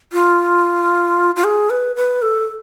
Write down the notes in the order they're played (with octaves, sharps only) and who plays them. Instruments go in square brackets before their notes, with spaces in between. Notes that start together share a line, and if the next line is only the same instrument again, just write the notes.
[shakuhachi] F4
F4
G#4
B4
B4
A4